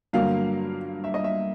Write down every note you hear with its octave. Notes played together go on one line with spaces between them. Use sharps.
G2 D3 F#3 A#3 F5
E5
D#5
E5